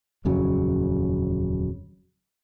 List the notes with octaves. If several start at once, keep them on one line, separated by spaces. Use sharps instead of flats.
D#1 F2 C#3 F#3